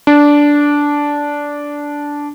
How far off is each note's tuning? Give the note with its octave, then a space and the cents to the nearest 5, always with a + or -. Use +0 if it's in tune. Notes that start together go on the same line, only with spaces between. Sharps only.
D4 -10